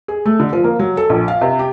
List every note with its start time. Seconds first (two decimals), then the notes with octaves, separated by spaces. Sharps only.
0.08 G#4
0.26 A3
0.40 D3
0.53 F3
0.64 A#3
0.79 F#3
0.97 A4
1.09 A#1
1.28 F5
1.42 C3
1.59 G4